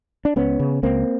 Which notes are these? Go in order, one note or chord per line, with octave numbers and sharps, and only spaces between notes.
D4
C#2 B3 C#4
C#3
C#2 A#3 C4